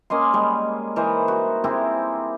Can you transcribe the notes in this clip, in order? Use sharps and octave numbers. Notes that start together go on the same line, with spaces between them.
A#3 C#4 D#5 C6
G3 G#3 C#6
E3 D#4 A#4 C5
F#4
C4 E4 G4 G#4